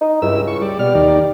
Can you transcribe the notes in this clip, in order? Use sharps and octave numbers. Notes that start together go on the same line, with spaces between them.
D#4
C#2 G2 E4 E6
C#6
G3 D5
B2 G3 F6
D#2 D#3 D5